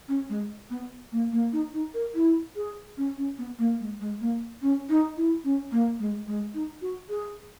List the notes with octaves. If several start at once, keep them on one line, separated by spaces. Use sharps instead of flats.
C#4
G#3
B3
A#3
A#3
D#4
D#4
A#4
E4
G#4
C#4
C#4
B3
A#3
G#3
G#3
A#3
C#4
D#4
E4
C#4
A#3
G#3
G#3
D#4
F#4
G#4